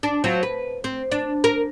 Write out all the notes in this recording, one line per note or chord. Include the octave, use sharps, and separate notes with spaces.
D4
F#3 C4 F4
B4
C4
D4
A#4